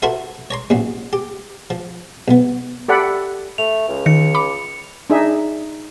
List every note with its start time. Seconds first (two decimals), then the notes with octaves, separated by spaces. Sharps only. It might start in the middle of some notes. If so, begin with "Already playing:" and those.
0.02 E4 F#4 A4 A#4 C5 E5
0.51 C#5 A#5 C6
0.70 A1 A#2 F#3
1.13 G4
1.70 F3
2.28 B1 B3
2.88 G4 A4 D5 F#5 B5
3.58 A3 F7
3.88 C#2
4.06 D#3 C#7
4.35 B5 D6
5.10 D4 D#4 G#4 E5